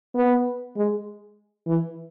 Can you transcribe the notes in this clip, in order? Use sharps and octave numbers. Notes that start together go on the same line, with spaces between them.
B3
G#3
E3